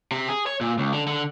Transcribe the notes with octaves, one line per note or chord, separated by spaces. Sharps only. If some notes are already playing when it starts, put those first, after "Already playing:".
C3
G#4
C#5
A#2
C#2
D3
D3